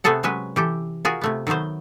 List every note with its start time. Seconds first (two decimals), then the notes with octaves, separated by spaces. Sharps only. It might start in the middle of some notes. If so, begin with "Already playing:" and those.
0.04 C3 A3 B3 G#4 A4 F#5
0.23 C3 F#3 G#3 C#4 B4
0.56 E3 G4 A4
1.05 F4 F#4 G#4 A#4
1.21 C3 A3 B3
1.47 D#3 F#3 A3 B3 C5